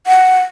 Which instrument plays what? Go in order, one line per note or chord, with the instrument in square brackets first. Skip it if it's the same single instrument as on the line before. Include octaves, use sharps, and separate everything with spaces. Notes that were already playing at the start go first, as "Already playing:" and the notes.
[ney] F#5